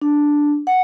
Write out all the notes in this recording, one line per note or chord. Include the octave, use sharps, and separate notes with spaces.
D4
F#5